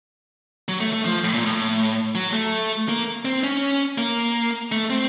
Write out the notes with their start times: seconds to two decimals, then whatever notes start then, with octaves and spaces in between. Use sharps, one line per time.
0.68 F#3
0.80 A3
0.93 A3
1.05 F3
1.24 A2
1.34 A#2
1.45 A2
2.15 F#3
2.33 A3
2.89 A#3
3.25 C4
3.43 C#4
3.98 A#3
4.72 A3
4.90 C4